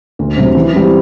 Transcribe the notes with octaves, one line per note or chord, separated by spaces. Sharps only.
D2
C3 F#3
E3
G3 C4 E4